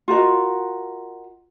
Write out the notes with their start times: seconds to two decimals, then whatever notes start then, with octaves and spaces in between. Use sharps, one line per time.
0.08 F4 F#4 A#4 D#5